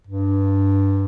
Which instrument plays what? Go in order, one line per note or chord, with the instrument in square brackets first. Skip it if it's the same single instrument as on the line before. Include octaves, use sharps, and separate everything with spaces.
[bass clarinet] G2